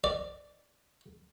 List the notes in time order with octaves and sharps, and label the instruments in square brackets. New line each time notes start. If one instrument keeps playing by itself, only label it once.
[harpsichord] D5